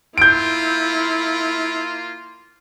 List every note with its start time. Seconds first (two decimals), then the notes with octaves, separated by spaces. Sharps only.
0.18 A#3 E4 F4 G6 D7